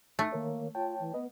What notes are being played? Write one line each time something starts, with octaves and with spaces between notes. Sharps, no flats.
A3 D#4
D#3 A#3 A#4 C#5
F4 C#5 G5 A5
E3
B3 B4 D#5